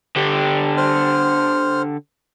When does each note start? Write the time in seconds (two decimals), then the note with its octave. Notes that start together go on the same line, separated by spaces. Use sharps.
0.16 D3 G4
0.77 C5 F6